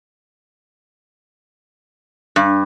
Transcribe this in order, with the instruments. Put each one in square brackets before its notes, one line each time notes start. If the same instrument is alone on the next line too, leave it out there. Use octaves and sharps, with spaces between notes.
[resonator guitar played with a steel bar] G2